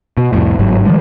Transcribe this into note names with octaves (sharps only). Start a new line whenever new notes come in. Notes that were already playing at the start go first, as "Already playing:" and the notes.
B2
C2 F2 A2
G1 G#2 F#3
D#3 F3 G3 G#3